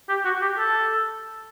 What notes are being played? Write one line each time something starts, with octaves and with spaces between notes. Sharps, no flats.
G4
F#4
G4
A4